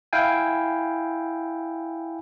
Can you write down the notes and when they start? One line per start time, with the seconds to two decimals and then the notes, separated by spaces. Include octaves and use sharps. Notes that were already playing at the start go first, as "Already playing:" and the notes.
0.13 E4 F5 G5 G#5